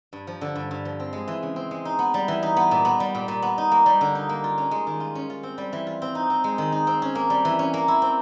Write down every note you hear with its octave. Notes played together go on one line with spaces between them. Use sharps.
G2
F3
D3
G2
G2
F3
C4
G#3
E3
C#3
C4
G#3
D#4
B3
G3
E3
D#4
B3
A#2
B3
G3
A#2
A#2
B3
D#4
A#3
G3
D3
D#4
A#3
F4
C#4
G#3
D#3
F4
C#4
F4
C4
G3
E3
F4
C4
D#4
C4
G#3
D#3
D#4
C4
C#4
A#3
G3
E3
C#4
A#3
E4
C4